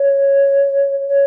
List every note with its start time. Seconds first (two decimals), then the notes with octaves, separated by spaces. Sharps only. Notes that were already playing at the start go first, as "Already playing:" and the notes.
Already playing: C#5
1.09 C#5